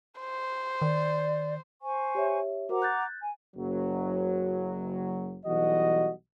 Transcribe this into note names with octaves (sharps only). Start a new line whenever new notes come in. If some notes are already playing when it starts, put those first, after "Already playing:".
C5
D#3 D5
C5 G#5 C#6
G4 C#5 E5
F#4 A#4 C5 F#5 A#5 D6
F#6 G6 A6
G#5
F#1 F#3
B1 E3 G3 F#4 D#5